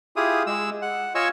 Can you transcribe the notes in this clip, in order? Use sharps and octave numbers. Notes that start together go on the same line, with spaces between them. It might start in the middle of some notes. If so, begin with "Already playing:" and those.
E4 F4 G4 G#4 D#6
G#3 E6
F#5
F4 C#5 D#5 G#5 C#6 E6